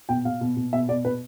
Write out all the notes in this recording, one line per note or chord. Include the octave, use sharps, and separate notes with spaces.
B2 G5
B2 F5
B2
B2
B2 E5
B2 D5
B2 B4